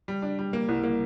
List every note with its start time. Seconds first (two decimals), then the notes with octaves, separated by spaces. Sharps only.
0.08 G3
0.22 D4
0.39 G3
0.53 A#3
0.69 C2
0.84 A#3